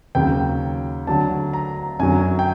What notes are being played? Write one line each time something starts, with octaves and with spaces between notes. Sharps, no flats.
D#2 C#3 F#3 G5
D2 D3 F#3 A5
A#5
F#2 D3 F#3 G#5
G5